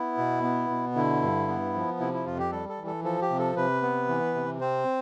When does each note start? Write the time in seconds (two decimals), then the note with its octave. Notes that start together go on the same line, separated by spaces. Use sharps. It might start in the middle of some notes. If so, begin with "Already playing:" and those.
Already playing: B3 E4
0.18 B2
0.43 B3
0.70 B2
0.95 D3 E4
1.22 G2
1.48 B3
1.74 F3
2.00 C3 E4
2.13 E4
2.26 F2 F4
2.39 G4
2.52 G3 A4
2.69 A4
2.79 E3
2.87 A4
3.04 F3 A4
3.22 G4
3.30 C3
3.39 A4
3.56 C3 B4
3.82 B3
4.08 E3
4.34 C3
4.61 C4 C5